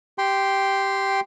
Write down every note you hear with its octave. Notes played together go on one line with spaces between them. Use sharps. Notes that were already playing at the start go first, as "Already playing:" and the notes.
G4 G5 C6